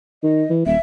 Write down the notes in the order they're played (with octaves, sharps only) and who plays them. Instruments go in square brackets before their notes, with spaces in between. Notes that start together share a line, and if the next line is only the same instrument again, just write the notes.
[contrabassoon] D#3 [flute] D#5
[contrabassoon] E3
[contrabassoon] D#1 [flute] E5